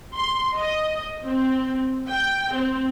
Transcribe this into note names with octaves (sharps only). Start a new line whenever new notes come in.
C6
D#5
C4
G5
C4